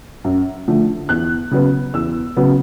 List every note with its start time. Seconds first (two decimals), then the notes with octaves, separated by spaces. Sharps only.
0.24 F#2
0.68 D3 F3 A3
1.09 E2 F#6
1.51 C#3 F#3 B3
1.94 E2 E6
2.37 C#3 F#3 B3